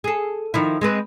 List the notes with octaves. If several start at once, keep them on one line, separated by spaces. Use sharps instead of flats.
G#4 A4
D#3 F3 E4
G#3 C4 B4